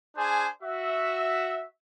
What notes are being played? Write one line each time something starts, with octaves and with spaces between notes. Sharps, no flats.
D4 G#4 C5 G#5
F#4 E5